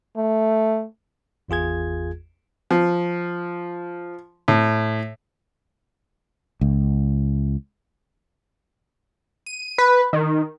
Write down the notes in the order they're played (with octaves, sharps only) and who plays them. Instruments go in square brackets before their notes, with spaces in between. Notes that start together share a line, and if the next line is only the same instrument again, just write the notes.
[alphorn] A3
[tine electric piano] G#1 E2 F4 G#4 G#6
[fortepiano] F3
A2
[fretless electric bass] C#2
[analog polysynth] D#7
B4
D#3